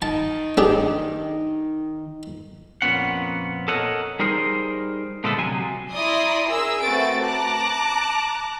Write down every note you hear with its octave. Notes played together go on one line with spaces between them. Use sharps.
D#3 D#4 A5
D4 G4 G#4
F2 A#2 B3 C#4 F#5
A4 A#4 C#5 D#5 F#5
G3 D#4 G#4 A#4 C5
A#2 D3 G#3 A3 B3 A4
C3 F#3 G#5
E4 D5 A#5 C6 D#6
G#4 A#4 E6
A3 C4 F#4 B4 A6 D7
A5 A#5 D6 F#6